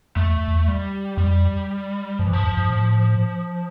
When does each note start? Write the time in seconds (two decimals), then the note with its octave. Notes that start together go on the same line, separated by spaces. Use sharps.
0.16 F2 A3
0.27 E2
0.48 E2
0.68 G3
1.17 F2 G3
2.19 G2 F3
2.26 E3
2.32 G2 F3
2.44 F2
2.57 G2
2.70 A2